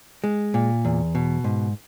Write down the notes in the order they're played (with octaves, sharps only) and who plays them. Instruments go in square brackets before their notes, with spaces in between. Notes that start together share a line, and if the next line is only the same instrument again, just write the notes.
[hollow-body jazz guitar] G#3
A#2
E2
B2
G#2